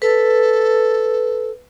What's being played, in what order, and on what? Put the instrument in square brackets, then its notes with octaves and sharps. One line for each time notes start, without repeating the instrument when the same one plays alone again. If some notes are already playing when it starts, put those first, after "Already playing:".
[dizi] A4 [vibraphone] B4